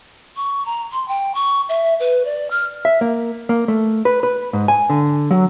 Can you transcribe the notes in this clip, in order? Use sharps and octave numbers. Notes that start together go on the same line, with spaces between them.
C#6
A#5
C6
G5
C#6
E5
B4
D5
F6
E5
A#3
A#3
A3
B4
B4
G#2
G#5
D3
F#3